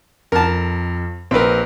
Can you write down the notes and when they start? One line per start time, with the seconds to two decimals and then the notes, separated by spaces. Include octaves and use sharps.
0.32 F2 A#4 A5
1.31 A#1 C4 A#4 B4